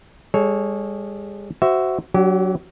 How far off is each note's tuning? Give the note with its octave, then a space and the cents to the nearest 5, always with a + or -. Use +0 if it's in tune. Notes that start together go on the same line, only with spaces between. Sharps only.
G#3 -45 A4 -40 C#5 +0
F#4 +15 C5 -10 E5 +0
F#3 +5 D4 -25 G4 -30